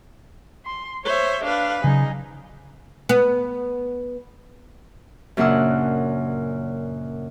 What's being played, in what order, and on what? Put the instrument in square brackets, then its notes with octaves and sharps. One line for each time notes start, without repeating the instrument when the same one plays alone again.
[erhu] C6
[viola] C5 E5 [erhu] C#5
[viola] D4 B4 [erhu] F5
[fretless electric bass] C#3 F#3 [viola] D#4 [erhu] G#4
[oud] B3
[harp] F#2 A#2 C#3 D4 F#5 E6